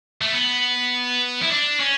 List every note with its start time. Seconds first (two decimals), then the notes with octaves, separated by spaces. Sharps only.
0.21 A3
0.32 B3
1.42 E4
1.51 D4
1.80 C#4